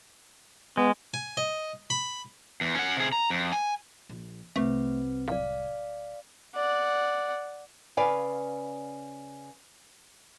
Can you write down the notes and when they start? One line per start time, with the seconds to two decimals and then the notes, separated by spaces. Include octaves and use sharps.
0.77 G#3 B3
1.14 G#5
1.37 D#5
1.90 B5
2.61 E2
2.75 C#4 F#5
2.97 C3 G#4
3.12 A#5
3.30 F2
3.52 G#5
4.09 A#1
4.56 C2 A3 C4 B4
5.28 D1 D5 F5
6.55 D5 F#5
7.97 C#3 B4 D5 F5 G#5